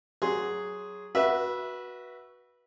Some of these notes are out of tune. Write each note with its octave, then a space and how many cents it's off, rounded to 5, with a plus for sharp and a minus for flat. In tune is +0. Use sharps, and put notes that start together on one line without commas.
F#3 +10 G#4 +0 C6 +0
F#4 +0 B4 -20 E5 +0